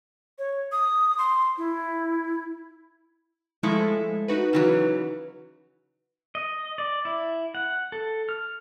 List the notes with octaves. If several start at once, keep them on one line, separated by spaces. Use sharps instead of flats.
C#5
D#6
C6
E4
F3 G#3 A3 E4 A4
D#4 F#4 B4
C#3 E3 F#3
D#5
D5
E4
F#5
A4
F6